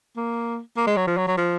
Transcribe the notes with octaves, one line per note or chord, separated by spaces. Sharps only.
A#3
A#3
G#3
F#3
F3
F#3
F#3
F3